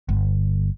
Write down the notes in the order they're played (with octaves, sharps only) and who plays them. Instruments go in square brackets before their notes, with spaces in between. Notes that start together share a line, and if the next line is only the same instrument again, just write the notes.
[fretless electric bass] G1